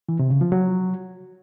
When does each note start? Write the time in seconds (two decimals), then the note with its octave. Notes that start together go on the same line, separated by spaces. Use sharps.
0.09 E3
0.19 C3
0.30 C#3
0.41 F3
0.52 F#3